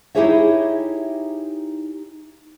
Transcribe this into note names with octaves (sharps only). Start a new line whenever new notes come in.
D#4 E4 G4 G#4 C#5 E5